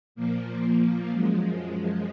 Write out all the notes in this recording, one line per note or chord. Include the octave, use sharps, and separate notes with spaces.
A#2 F3 A#3
F#2 F3 G#3